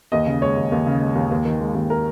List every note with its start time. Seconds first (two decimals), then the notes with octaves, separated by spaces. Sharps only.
0.12 D#2 D#5
0.27 C#3
0.42 G#3 C#5
0.57 D#2
0.72 D#2
0.86 C#3
1.01 G#3
1.15 D#2
1.31 D#2
1.45 D#3
1.60 G#3
1.75 D#2
1.90 A#4